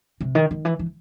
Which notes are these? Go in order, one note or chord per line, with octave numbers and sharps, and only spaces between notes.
C3
D#3
D#3
E3
E3